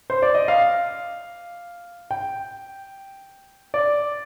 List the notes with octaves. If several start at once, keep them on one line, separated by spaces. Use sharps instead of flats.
C5
D5
D#5
F5
G5
D5